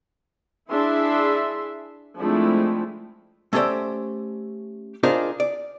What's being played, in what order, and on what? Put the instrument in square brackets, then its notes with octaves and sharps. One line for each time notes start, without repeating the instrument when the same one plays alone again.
[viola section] D4 E4 G#4 E5 C6
F3 G#3 A3 C4 D4 E4
[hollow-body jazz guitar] A3 C#4 G4 A4 C5 D5
D4 D#4 F4 G#4 A#4 C5
D5